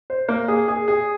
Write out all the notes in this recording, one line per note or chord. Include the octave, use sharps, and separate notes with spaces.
C5
A#3
G#4
G#4
G#4